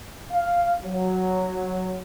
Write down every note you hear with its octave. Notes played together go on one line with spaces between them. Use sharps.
F5
F#3